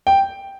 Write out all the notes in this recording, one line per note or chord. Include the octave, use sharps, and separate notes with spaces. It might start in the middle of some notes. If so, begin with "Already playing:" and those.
G5